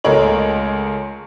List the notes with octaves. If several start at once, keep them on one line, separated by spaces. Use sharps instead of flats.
C#2 G#3 A3 A#4 C#5 F#7